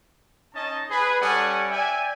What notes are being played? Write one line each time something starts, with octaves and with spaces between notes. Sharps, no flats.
C#4 D#4 D#5 A5
G#4 B4
G3 C#4 A4 D5 F#5 G#5
D5 E5 G5 G#5